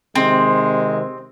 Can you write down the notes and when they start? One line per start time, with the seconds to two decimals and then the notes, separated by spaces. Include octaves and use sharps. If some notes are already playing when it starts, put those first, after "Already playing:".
0.15 C3 D#3 G#3 C4